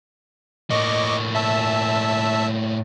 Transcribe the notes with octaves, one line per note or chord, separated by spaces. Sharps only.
A2 A#3 D#5 C#6 D6
E5 A5 E6